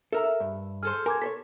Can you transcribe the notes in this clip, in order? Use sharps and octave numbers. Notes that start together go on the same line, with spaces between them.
A4 A#4 E5 A#5
G2
G#4 A4 C5 F6
A#4 G#5 D6 G#6
A4 C5 C#5 B6